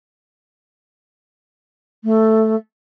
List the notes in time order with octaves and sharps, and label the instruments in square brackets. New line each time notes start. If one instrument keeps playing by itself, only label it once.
[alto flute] A3